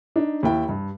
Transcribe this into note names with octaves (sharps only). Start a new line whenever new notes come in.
D4 D#4
D#2 E4 G5
G2